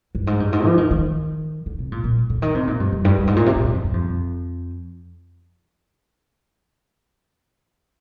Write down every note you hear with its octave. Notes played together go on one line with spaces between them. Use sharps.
G2
G#2
G2
G#2
F3
D#3
D#3
D3
C3
A#2
A#2
D3
D#3
C3
A#2
G2
F2
G2
G2
G#2
A#2
C3
A#2
G#2
F2
G2
F2